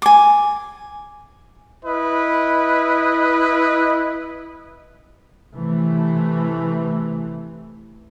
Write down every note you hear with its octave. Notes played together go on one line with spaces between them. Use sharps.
G#5 D6
E4 B4 D#5
C3 E3 A3